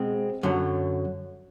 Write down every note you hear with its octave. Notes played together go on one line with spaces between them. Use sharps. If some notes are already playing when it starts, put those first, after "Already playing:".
Already playing: B2 G#3 C4
F#2 D3 F#3